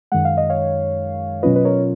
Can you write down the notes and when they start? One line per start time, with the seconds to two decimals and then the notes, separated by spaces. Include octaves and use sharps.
0.12 F#2 D#3 G#3 F#5
0.25 F5
0.37 D#5
0.50 C#5 F5
1.43 B2 F#3 C#4 F4 B4 D#5
1.56 B4
1.65 A#4 C#5